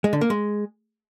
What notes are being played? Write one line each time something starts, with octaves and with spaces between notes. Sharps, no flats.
G#3
D3
A#3
G#3